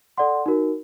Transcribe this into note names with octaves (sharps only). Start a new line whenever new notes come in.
A4 D5 F#5 C6
D#4 F#4 A#4